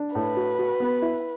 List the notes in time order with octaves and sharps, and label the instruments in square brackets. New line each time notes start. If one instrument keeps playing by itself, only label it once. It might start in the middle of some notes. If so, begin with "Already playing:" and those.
Already playing: [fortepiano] D4
[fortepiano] A2 [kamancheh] B4
[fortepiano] F#4
F#4
B3
E4